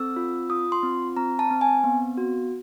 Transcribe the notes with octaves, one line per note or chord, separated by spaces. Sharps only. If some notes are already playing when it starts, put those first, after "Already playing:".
Already playing: C4 A4 E6
F4
F4 D#6
C6
C4
C4 A#5
A5
C4
G#5
B3
F#4